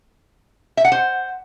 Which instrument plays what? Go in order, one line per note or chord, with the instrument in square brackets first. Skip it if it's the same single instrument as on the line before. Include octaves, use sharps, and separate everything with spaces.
[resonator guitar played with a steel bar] E5
F#5
C5